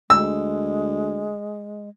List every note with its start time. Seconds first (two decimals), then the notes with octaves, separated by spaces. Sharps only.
0.10 D2 G#3 E6